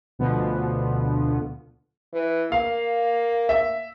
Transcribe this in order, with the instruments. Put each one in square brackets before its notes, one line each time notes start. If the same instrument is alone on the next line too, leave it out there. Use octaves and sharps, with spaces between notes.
[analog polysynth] D2 B2 D3 F3 B3
[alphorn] E3
[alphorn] A#3 [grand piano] F5
[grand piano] E5